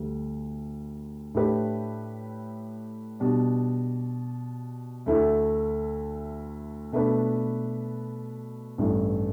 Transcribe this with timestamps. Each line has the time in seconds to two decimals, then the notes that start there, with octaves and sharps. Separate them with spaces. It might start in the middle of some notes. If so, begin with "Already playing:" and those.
Already playing: D2 D3 G3
1.34 A2 A3 D4 G4 B4
3.20 B2 G3 D4
5.06 D2 D3 A3 E4
6.92 B2 A3 D4 B4
8.78 A1 G2 E3 A3